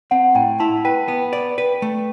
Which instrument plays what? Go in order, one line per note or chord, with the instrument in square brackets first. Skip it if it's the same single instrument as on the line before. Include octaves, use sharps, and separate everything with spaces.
[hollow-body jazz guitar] C4 [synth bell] F#5
[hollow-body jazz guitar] A2 [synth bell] G5
[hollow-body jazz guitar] E4 [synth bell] A5
[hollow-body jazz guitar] B4 [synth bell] G5
[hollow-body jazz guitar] B3
D5
B4
A3